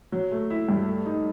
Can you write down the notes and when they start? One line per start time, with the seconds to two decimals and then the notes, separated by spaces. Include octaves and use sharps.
0.12 F#3
0.31 A3
0.50 E4
0.69 G2
0.86 A3
1.06 D#4